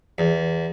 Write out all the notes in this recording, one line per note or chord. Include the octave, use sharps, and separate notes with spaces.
E2